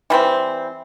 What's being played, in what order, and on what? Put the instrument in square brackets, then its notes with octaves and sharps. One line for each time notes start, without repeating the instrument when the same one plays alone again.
[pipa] E3 G3 C4